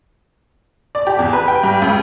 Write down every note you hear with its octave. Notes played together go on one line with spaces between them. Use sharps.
D5
G4
E2
B4
G5
G2
C#2